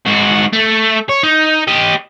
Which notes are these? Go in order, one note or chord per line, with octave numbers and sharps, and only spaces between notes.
G#2 F#4
A3
C#5
D#4
G4 D#5